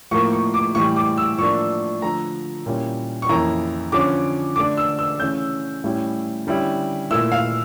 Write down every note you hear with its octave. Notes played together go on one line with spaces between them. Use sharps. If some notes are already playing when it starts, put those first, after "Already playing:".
A2 F3 A#3 C#6
C#6
D6
A2 E3 G3 C#6
D6
E6
A2 F3 A#3 D4 C#6
D3 F3 A3 A#5
A#2 G3 C#4 E4
C#6
F2 E3 A#3 C#4 E4 A#5
D3 F3 C#4 D6
D3 A3 D4 D6
E6
E6
C#3 E3 A3 C#4 G6
A2 G3 C#4 E4
D3 G3 C#4 E4
A#2 A3 E4 E6
F5